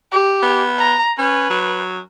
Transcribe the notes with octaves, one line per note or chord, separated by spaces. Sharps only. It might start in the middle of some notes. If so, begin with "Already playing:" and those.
G4
B3
A#5
C#4 B4
F#3